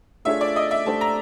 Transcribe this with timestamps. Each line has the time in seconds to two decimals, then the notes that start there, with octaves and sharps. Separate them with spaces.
0.25 A3 D4 F4 G#4 C#5 E5
0.41 D5
0.56 D#5
0.71 E5
0.86 A3 D4 G4 C5 A5
1.01 A#5